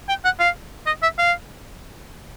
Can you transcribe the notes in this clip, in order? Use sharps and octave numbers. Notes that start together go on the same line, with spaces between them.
G5
F#5
F5
D#5
E5
F5